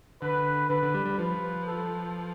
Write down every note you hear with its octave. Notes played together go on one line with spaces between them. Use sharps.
D3 B4
D3 B4
D3
G3
G3
F3 B4
A4